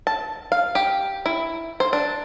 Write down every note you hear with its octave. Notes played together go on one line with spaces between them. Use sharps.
A5
F5
G4
E4
C5
D4